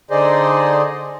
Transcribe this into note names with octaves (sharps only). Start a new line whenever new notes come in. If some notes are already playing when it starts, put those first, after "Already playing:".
D3 D#4 G#4 C5 D5 D#5